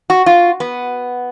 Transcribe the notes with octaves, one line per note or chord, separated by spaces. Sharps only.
F#4
F4
B3